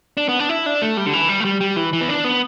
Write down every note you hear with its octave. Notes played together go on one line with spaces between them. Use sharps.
D4
B3
D4
E4
D4
A3
G3
D3
E3
G3
A3
G3
G3
E3
E3
B3
D4
B3